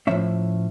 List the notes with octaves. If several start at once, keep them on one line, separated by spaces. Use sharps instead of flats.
A2 F3 A#3 C#4 E5